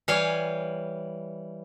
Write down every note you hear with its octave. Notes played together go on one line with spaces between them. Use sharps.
E3 G3 C#5 F5 G#5